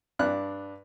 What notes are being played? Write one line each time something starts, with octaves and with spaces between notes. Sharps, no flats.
G2 D4 F#6